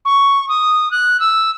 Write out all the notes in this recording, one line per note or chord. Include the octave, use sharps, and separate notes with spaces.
C#6
D#6
F#6
E6